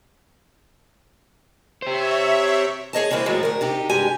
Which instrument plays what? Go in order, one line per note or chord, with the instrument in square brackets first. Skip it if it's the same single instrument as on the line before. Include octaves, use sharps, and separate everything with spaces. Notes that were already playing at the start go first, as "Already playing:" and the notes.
[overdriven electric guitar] G4 C5 [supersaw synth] C#5 E5
[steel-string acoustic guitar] G#4 C#5 D#5 A5
E3 G#3 A#3 C4 E4
D#2 A2 F3 F#3 G#3
D2 A#4
C3 D#4 G4
G2 G#3 G4 G#5